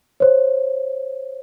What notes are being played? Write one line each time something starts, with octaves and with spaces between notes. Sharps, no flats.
C5 C#5